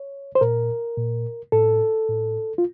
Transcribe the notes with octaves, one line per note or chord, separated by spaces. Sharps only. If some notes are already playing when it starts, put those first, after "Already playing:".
Already playing: C#5
C5
A#2 A#4
A#2
A2 A4
A2
F4